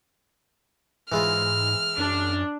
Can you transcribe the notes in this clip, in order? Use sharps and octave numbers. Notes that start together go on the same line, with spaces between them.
G#2 E3 G#3 F4 F6
F#2 D4